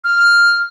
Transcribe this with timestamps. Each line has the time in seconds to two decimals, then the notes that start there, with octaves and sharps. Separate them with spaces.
0.04 F6